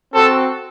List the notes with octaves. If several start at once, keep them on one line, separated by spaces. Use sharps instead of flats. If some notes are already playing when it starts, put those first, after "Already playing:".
C4 F#4 A4